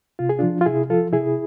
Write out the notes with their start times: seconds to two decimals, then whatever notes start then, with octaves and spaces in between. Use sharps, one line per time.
0.19 C3 F4
0.29 G#4
0.39 F3 D4 F4
0.61 F4
0.66 C3 E4 G#4
0.90 F3 F4 A4
1.13 C3 E4 G#4